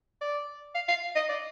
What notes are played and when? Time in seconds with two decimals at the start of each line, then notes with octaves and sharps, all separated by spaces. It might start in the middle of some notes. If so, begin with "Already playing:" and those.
0.21 D5
0.75 F5
0.89 F5
1.16 D#5
1.29 D5